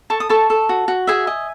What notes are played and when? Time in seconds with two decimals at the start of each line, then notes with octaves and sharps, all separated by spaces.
0.10 A4 A5 C#6
0.20 D#6
0.29 A4 A5 C#6
0.50 A4
0.69 F#4
0.88 F#4
1.07 G#4 E5 G#5
1.27 D#5